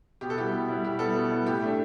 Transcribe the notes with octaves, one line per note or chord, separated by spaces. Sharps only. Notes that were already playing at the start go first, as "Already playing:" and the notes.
B2 G4
A4
G3 B3 E4 G4
B2
G3 B3 E4
B2 G4
G3 B3 E4 A4
B2
G3 B3 E4
A2 G4
A3 D4